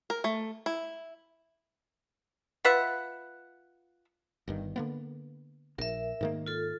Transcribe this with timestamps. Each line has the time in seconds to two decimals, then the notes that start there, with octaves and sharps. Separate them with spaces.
0.10 A#4
0.24 A3
0.66 E4
2.65 F4 B4 E5 F#5
4.48 G1 G2 D#3
4.76 D3 A#3 B3
5.78 A#1 A#4 E5
6.21 G#2 D#3 A#3
6.46 F4 A4